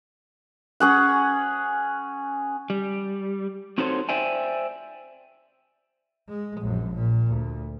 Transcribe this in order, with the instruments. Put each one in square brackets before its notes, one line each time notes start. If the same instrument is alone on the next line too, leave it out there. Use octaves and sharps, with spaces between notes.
[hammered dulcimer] C#4 G#4 F#5
[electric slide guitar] G3
C4 D#4 F#4 A4 C5 C#5
C5 D5 E5 G5 G#5
[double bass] G#3
A#1 F#2
A#2
D2